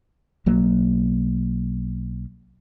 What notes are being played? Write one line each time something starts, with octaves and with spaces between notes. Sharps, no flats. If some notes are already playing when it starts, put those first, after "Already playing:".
B1 F#3 A#3